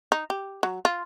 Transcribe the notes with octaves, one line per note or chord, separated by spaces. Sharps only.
D#4
G4
F#3
F4